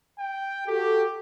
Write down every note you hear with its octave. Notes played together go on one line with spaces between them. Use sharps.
G5
F#4 G4 A4